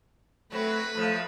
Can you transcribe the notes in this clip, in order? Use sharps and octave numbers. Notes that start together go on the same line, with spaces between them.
F#3 A3 C4 B4
A2 F3 A3